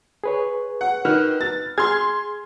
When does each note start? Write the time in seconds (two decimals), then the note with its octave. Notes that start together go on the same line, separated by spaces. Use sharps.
0.24 G#4 B4 C#5
0.81 F#5
1.05 D#3 B4 F6 F#6
1.41 A6
1.78 G#4 C6 F6 G#6